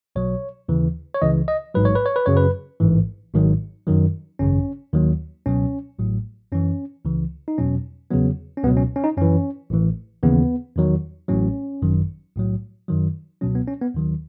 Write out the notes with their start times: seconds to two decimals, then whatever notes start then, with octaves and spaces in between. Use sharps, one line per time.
0.16 B1 B2 F#3 C#5
0.68 D#2 C#3 E3
1.15 C#5
1.21 C#2 C#3 E3 D#5
1.48 D#5
1.75 A1 G#2 F#3 B4
1.85 C#5
1.95 B4
2.06 C#5
2.16 B4
2.26 F#2 C#3 F#3 C#5
2.37 B4
2.80 A1 G#2 E3
3.34 G#1 G#2 D#3 F#3
3.87 F#2 D#3 F#3
4.39 G#1 F#2 C#3 C#4
4.93 D#2 D#3 F#3
5.46 C#2 B2 F#3 C#4
5.99 A1 A2 F#3
6.52 F#2 E3 C#4
7.05 C#2 C#3 E3
7.48 D#4
7.58 E2 B2 F#3 C#4
8.11 E2 C#3 F#3 B3
8.57 C#4
8.64 C#2 B2 F#3 B3
8.77 C#4
8.96 C#4
9.04 D#4
9.17 F#2 E3 C#4
9.70 A1 A2 E3
10.23 D#2 C#3 E3 B3
10.76 E2 D#3 F#3
11.29 A1 A2 F#3 C#4
11.82 G#1 F#2 D#3 F#3
12.36 B1 A2 F#3
12.88 F#2 D#3 F#3
13.41 C#2 B2 F#3 C#4
13.55 B3
13.68 C#4
13.81 B3
13.94 D#2 D#3 F#3